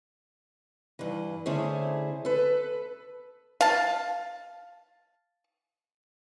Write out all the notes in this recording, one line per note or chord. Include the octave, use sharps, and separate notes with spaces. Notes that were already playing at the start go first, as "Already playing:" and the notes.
G2 E3
D3 A3 C#4 E4 G#4 C5
A4 B4
F5 A5